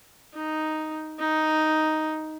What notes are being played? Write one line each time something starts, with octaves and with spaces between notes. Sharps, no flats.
D#4
D#4